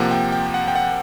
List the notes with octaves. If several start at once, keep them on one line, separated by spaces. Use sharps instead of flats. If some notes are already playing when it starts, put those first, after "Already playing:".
Already playing: C3 F3 A#3 F#5
G5
G5
F#5
G5
F#5